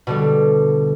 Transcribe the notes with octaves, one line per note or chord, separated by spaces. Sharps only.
B2 D3 G3